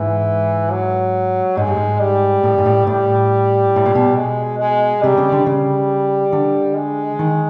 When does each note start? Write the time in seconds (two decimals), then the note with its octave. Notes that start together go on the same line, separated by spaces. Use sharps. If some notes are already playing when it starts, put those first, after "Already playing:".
Already playing: G#2 E3
0.71 F#3
1.57 G#2 G#3
1.67 G2
1.77 G#2
2.00 G3
2.43 A2
2.58 G#2
2.65 A2
2.87 A2 G3
3.76 A2
3.86 A#2
3.95 B2
4.16 G#3
4.60 G#3
5.03 C3 G3
5.17 C#3
5.32 D3
5.46 C#3 G3
6.32 D3
6.76 G#3
7.19 D#3